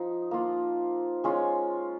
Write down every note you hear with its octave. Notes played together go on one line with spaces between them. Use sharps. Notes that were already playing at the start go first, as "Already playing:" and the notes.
Already playing: F3 D#4
A#3 F4
G#3 C#4 F4